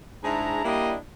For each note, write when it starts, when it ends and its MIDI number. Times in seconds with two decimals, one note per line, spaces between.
0.24 0.61 44
0.24 0.61 62
0.24 0.61 64
0.24 0.61 68
0.24 0.61 82
0.64 0.95 55
0.64 0.95 58
0.64 0.95 62
0.64 0.95 64
0.64 0.95 67
0.64 0.95 75